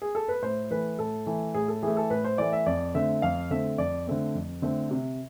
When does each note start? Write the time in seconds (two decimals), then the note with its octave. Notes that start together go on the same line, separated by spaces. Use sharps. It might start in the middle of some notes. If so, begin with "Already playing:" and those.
0.02 G#4
0.15 A4
0.28 B4
0.42 A2 C5
0.70 E3 A3 B4
0.99 A2 A4
1.27 E3 A3
1.54 A2 G#4
1.68 A4
1.83 E3 A3 G#4
1.97 A4
2.10 A2 B4
2.25 C5
2.38 E3 A3 D5
2.53 E5
2.66 F2 D5
2.94 D3 A3 C4 E5
3.22 F2 F5
3.51 D3 A3 C4 E5
3.78 F2 D5
4.07 D3 A3 C4
4.35 F2
4.62 D3 A3 C4
4.91 C3